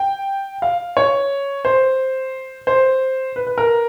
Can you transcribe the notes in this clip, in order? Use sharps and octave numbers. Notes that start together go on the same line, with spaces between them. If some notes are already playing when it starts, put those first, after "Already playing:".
Already playing: G5
F5
C#5
C5
C5
B4
B4
A#4